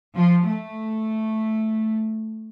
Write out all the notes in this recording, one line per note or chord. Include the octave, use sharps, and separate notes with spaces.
F3
A3